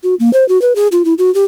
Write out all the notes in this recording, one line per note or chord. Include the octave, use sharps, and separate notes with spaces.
F#4
A#3
C5
F#4
B4
G#4
F4
E4
F#4
G4